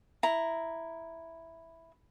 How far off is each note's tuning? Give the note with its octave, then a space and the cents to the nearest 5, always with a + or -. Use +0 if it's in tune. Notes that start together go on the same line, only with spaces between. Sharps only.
E4 +0 A#5 +0